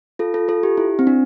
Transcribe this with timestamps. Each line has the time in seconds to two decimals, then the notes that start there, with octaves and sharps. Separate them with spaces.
0.19 F4 A4
0.34 F4 A4
0.48 F4 A4
0.63 G4
0.78 E4
0.99 C4
1.07 D4